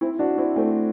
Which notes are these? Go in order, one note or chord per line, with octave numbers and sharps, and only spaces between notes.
C4 E4
D4 F#4
C4 E4
A3 C4